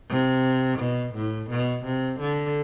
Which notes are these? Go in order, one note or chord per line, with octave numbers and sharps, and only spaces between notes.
C3
B2
A2
B2
C3
D3